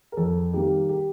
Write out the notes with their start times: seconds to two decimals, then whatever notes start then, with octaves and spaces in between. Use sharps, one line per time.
0.12 A#4
0.17 F2 A4
0.53 D#3 G3 A#3 G4
0.89 G4